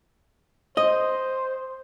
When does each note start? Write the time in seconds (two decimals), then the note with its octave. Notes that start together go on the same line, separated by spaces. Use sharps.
0.77 C5 D#5